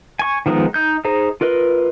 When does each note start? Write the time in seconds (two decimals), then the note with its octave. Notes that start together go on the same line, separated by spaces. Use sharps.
0.19 G#5 C#6
0.46 D#3 F3 G#3 B3 D#4
0.74 D#4 G6
1.05 D#4 G#4 C5 A#5
1.41 F4 A#4 B4 D#5